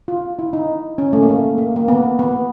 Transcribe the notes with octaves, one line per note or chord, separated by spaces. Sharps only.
F4
E4
D#4
C#4
A3
A#3
A3
A#3
A#3
B3
B3